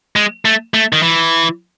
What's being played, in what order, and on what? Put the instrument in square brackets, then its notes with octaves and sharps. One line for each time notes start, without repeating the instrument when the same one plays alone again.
[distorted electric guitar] G#3
A3
A3
D#3
E3